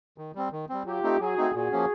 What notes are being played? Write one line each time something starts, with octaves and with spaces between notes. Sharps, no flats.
D#3
G3 C4
D#3
G3 C4
F#3 F4 G4
A3 C4 D#4
F#3 F#4 G#4
A3 C4 D#4
A#2 F#4 G#4
F3 A#3 C#4